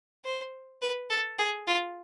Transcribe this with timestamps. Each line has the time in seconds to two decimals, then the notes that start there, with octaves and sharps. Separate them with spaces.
0.25 C5
0.82 B4
1.10 A4
1.39 G#4
1.67 F4